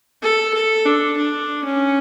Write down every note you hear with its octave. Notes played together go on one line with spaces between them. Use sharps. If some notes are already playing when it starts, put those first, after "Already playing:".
A4
A4
D4
D4
C#4